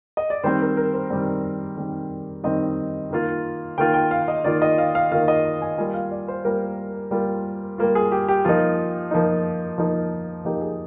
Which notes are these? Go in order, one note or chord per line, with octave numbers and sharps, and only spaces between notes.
D#5
D5
D#3 G3 C4 C5
A#4
A#4
C5
D#3 G3 C4 D5
D#3 G3 C4
D#3 G3 C4 D#5
D#3 A#3 F4
D#3 A#3 F4 G5
G5
F5
D#5
D#3 A#3 F4 D5
D#5
F5
F5
D#3 A#3 F4 F5
D#5
G#5
G3 A#3 F4 G#5
F5
D5
C5
G3 A#3 F4 A#4
G3 A#3 F4
G3 A#3 F4
G#4
G4
G4
F3 A#3 D#4 F4
F3 A#3 D#4
F3 A#3 D#4
F3 A#3 D#4 G4
G#4